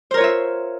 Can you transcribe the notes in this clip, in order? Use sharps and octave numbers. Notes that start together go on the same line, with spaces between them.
F4 A#4 C5 C#5 E5